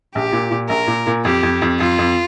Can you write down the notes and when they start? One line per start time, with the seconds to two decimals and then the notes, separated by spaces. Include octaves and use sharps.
0.15 A#1 G4
0.32 A#2
0.51 A#2
0.69 A#1 A#4
0.87 A#2
1.07 A#2
1.25 F2 G4
1.43 F2
1.62 F2
1.80 F2 F4
1.98 F2